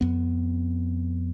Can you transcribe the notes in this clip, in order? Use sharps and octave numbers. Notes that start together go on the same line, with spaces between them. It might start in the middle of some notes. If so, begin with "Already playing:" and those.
F2 B3